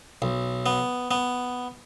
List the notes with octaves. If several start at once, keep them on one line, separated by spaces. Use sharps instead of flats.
B1
B3
B3